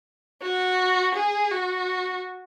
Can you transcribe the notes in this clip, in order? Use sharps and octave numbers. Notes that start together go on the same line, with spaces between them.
F#4
G#4
F#4